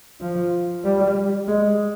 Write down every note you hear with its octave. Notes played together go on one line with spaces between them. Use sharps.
F3
G3
G#3